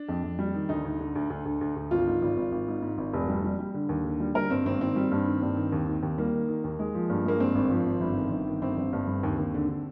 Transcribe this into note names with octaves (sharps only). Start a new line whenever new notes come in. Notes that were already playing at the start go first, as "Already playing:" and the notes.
Already playing: D4
F2
F2
G3
D#3
D2 D#4
D2
D3
D2
D2
D2
D2
D2
G#1 F4
G#2
G#1
G#1
G#1
G#2
G#2
G#1
F1
G3
G3
G3
D3
D#2
D3
G3
G3 A#4
G2 C4
G#1 C4
D#3 C4
G3
G2
D#3
G2
D#3
D#2
D#3
D#2
G3 A#3
D#3
D#3
D#2
G#3
F3
G2
G#3 A#3
G2 C4
G#1
F3
G#1
G1
D#3
G1
D#3
G1 C4
G1
G2
G1
D#2
D#2
D3
D3